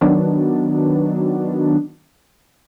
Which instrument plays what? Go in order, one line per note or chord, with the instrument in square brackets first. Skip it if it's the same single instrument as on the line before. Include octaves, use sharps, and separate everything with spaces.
[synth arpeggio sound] D#3 F#3 B3 D4